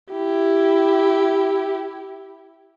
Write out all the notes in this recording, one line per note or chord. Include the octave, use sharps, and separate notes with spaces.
E4 G4